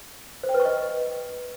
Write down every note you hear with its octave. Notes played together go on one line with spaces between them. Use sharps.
C5
G5
B4
C#6
D#5